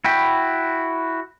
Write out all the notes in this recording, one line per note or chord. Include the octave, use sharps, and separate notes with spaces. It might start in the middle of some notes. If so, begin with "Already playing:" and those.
E4 F#4 G5 B5